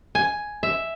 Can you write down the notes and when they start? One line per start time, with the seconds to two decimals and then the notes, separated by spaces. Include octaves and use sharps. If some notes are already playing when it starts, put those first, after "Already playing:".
0.15 G#5
0.63 E5